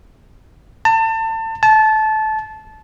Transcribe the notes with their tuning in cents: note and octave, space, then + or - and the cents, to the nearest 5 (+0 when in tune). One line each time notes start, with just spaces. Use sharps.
A5 +30
A5 -20